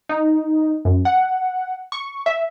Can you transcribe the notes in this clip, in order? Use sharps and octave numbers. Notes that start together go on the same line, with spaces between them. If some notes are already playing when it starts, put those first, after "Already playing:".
D#4
F#2
F#5
C#6
E5